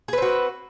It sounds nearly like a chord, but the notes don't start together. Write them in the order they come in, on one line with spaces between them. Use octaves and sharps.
G#4 B4 C4 F#4